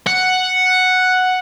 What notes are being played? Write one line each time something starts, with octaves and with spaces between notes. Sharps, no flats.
F#5